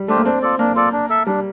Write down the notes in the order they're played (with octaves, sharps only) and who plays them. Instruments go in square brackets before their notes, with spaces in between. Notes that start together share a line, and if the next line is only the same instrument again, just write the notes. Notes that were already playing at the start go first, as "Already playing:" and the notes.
Already playing: [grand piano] G3
[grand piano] A3 [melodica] D4 G4 C5
[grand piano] A#3
[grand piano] C4 [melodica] D4
[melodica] F4 A4 D5
[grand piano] A#3 [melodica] D4
[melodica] F4 A4 D5
D4
A4 E5
[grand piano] G3 [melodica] D4